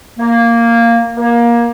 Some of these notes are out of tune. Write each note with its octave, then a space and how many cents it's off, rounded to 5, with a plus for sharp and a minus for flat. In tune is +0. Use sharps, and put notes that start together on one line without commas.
A#3 -5
A#3 +20